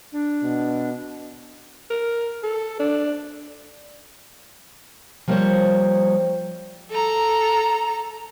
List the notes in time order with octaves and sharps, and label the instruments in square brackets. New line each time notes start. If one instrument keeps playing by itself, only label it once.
[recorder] D4
[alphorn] B2
[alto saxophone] A#4
A4
D4
[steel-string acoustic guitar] F3 G3 A#3 F4 C5 C#5
[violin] A4 A#5